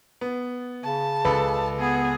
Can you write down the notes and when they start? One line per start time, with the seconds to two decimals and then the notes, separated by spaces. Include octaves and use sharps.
0.21 B3
0.84 C#3 A5
1.25 C#2 A4 B4 B5
1.79 B3 G#4